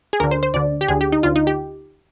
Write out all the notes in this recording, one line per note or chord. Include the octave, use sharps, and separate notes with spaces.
G#4
D2 D3 A#4
C5
C5
D2 D3 D5
G4
D2 D3 G#4
G4
D#4
D2 D3 F4
D#4
G4